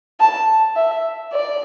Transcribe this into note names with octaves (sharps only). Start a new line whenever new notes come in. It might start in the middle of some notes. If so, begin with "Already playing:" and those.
A5
E5
D5